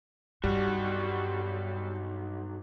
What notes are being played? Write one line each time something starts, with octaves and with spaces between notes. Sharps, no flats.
B1 G2 G3 F#4